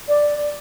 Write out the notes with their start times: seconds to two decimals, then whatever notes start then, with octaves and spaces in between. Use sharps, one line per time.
0.08 D5